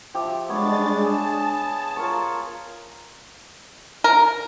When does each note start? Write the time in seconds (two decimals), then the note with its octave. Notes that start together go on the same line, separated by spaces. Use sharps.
0.14 F3 G4 E5
0.49 G#3 B3 D4 C#5 A6
1.03 G#4 A5
1.97 F4 A#4 C#5
4.04 A#4